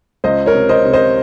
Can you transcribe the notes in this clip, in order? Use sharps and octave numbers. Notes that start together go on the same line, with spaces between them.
C#2 C5 D#5
A#4 C#5
C3
C5 D#5
C3
C5 D#5